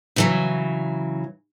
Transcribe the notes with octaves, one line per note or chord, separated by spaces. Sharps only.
C#3 E3 F#3